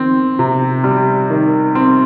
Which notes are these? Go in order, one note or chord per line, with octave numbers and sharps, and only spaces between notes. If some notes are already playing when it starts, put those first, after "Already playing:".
Already playing: D#3 C4
C3
G3
D#3
C4